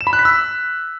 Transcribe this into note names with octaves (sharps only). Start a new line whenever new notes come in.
E7
B5
F#6
B6
E6